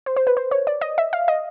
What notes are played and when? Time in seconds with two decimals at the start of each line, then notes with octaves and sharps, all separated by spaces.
0.06 C5
0.16 C5
0.27 B4
0.37 C5
0.51 C#5
0.67 D5
0.81 D#5
0.98 E5
1.13 F5
1.28 D#5